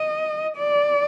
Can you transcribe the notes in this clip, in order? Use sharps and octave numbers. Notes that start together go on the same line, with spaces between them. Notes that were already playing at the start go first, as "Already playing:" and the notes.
Already playing: D#5
D5